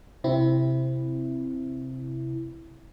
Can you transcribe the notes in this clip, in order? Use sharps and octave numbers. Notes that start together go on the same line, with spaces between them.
C3 C4 E4